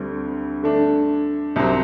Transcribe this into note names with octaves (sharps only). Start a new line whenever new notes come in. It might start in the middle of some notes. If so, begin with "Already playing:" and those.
Already playing: D2 D3 G3 C4
D3 A3 D4
C2 C3 F#3 C4